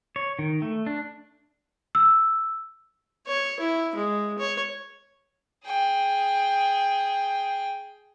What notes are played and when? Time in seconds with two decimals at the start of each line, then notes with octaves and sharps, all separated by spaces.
0.16 C#5
0.39 D#3
0.62 A3
0.86 D4
1.95 E6
3.27 C#5
3.60 E4
3.96 G#3
4.39 C#5
5.66 G#4 G5